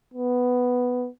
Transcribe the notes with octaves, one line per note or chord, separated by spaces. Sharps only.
B3